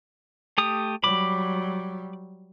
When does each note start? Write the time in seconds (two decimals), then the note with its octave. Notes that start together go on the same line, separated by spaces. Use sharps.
0.58 A3 G4 D#6
1.04 F#3 G3 B5 D6